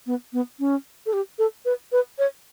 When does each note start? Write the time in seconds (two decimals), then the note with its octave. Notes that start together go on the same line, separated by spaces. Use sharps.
0.07 B3
0.33 B3
0.59 C#4
1.06 A4
1.13 G4
1.39 A4
1.65 B4
1.92 B4
2.19 C#5